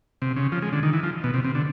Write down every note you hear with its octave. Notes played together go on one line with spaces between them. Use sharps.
C3
C#3
F3
G#3
D3
D#3
E3
F3
B2
C3
C3
D3